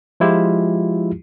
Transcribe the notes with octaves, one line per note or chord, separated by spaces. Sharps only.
F3 G#3 E4 F4 G4